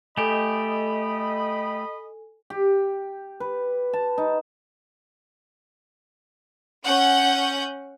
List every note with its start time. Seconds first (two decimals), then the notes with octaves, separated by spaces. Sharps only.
0.17 A3 G4 A4 D#5 G#5 B5
2.50 G4
3.40 B4
3.93 A5
4.18 D#4
6.85 C#4 F#5 G6